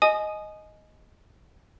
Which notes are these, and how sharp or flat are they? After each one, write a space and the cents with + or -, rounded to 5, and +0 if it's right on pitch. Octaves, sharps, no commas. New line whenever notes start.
D#5 +0 G#5 +25 D#6 -15